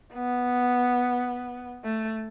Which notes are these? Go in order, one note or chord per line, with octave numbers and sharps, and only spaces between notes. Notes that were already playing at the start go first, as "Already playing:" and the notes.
B3
A3